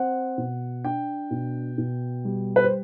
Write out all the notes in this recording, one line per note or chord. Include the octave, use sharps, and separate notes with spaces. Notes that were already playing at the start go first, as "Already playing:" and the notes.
Already playing: C4 F#5
B2
D4 G5
B2
B2
G3
B4
C5